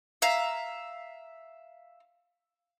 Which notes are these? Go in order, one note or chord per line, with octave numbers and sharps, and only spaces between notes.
E5 F5 A#5